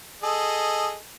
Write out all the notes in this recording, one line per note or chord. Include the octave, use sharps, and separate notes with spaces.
G#4 A4 D#5